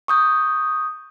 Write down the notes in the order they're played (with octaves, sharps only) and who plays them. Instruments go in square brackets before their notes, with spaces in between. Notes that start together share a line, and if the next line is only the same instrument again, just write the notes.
[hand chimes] C#6 D#6 G6